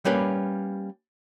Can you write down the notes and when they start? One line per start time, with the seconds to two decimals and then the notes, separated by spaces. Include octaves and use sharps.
0.05 G3 A#3 C#4 G4 B4